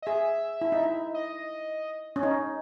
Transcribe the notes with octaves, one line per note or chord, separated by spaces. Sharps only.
D#5
G#4 E5
E4
D#4
E4
D#5
C#4
D#4